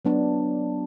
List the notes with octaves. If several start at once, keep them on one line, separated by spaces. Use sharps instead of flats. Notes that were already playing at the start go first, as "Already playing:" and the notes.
F#3 B3 D4